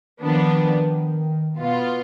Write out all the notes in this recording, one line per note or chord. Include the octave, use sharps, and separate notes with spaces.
D#3 F3 B3 D4
B2 B3 F4